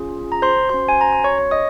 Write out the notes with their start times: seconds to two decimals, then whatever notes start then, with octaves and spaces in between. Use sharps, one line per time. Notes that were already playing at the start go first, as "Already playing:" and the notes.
Already playing: C#4 F4 G#4
0.32 A#5
0.42 C5 C6
0.69 C#4 F#4 C5 C6
0.89 G#5
1.01 A#5
1.13 C6
1.24 C#5 C#6
1.38 C#5 C#6
1.51 D#5 D#6